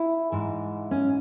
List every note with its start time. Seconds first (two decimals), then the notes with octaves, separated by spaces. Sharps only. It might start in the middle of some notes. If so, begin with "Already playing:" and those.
Already playing: E4
0.32 G#2 E3
0.91 C#4